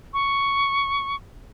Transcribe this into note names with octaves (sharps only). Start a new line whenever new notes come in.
C#6